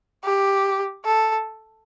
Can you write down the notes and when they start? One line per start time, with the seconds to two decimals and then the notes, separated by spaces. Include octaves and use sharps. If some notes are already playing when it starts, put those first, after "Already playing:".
0.24 G4
1.05 A4